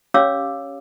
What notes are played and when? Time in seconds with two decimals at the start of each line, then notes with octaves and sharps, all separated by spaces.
0.14 C#4 G4 C#5 F5 D6 E6